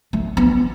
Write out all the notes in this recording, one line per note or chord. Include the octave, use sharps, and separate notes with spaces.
A3
B3